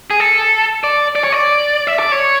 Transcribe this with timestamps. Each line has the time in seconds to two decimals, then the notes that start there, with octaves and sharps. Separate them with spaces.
0.11 G#4
0.20 A4
0.84 D5
1.15 D5
1.24 C#5
1.32 D5
1.87 E5
1.99 D5
2.12 C#5